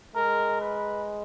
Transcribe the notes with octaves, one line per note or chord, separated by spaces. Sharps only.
G#3 A#4
B4